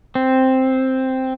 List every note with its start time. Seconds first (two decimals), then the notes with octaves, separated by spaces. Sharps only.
0.15 C4